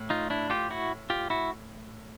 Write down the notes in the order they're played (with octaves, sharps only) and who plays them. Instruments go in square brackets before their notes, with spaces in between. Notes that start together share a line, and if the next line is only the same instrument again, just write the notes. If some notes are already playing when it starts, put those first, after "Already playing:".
Already playing: [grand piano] A2
[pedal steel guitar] D#4 F4
D4 E4
F4 G4
E4 F#4
F4 G4
E4 F#4